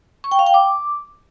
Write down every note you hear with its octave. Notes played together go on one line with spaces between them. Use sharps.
C#6
G5
F5
G5
D6